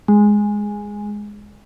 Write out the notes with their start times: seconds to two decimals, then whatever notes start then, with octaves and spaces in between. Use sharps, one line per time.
0.08 G#3